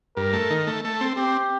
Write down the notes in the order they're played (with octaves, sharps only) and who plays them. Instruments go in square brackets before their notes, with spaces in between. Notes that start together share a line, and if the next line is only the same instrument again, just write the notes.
[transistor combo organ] G2 [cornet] A#4
[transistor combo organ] A3
D#3
A3
[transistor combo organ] A3 [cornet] A4
[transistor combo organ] C4
[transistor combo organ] C4 [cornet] G4